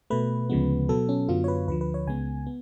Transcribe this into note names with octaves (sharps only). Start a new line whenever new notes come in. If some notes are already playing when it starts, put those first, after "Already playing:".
B2 A3 B4
D2 C#3 F3 G#3 B3
B2 F#3 B3 A4
C#4
F#2 D3 F#3 B3 F4
C#5
B4
D2 D3 F3 B4
B4
C#5
C#2 C#3 G#3 B3 G#5
B3